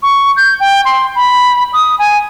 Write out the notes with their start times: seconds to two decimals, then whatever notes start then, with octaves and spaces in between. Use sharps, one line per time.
0.02 C#6
0.37 G6
0.60 G5
0.85 C6
1.15 B5
1.73 D#6
1.99 G#5